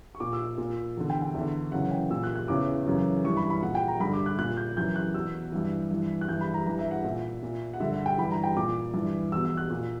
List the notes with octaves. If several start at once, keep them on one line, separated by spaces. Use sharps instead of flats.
C#6
A#2 D6
E6
A#2
E2 D3
G5
G5
E2 D3 E5
F#2 C#3 E3 F#5
G5
A#2 E6
F#6
F#6
E2 C#3 E3 D6
F#2 C#3 E3
G2 E3 C#6
B5
B5
A#2 F#5
G5
A#5
G2 D3 B5
D6
F#6
A#2 F#6
G6
F#2 E3 G6
F#6
E2 B2 E6
G2 E3
G2 E3
F#6
G2 E3 G6
B5
A#5
G2 E3 A#5
E5
F#5
A#2 E5
A#2
F#5
G2 D3 E5
F#5
G5
G2 E3 B5
A#5
G5
A#2 D6
G2 E3
E2 B2 E6
E6
F#6
A#2